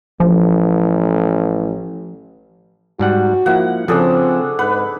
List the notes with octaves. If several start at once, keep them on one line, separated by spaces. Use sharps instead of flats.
A1 F3
G#2 G3 F#4 F#5
F3 A#3 E4 F#5
C#3 F3 C4 D4 G#4 A4
G#2 B4 F#5